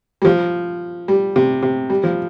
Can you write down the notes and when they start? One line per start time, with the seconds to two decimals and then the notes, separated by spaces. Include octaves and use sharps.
0.22 G3
0.25 F3
1.08 G3
1.36 C3
1.62 C3
1.90 G3
2.03 F3